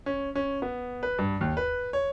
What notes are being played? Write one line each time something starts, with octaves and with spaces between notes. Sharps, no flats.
C#4
C#4
B3
B4
G2
D#2
B4
C#5